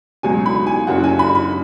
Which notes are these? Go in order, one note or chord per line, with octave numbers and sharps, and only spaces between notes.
C#2 B2 F#3 G#5
B5
G#5
F#1 F#2 F#3 F#5
G#5
B5
B5